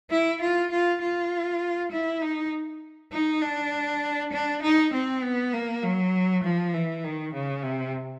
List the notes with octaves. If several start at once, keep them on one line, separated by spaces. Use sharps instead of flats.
E4
F4
F4
F4
E4
D#4
D#4
D4
D4
D#4
C4
B3
A#3
F#3
F3
E3
D#3
C#3
C3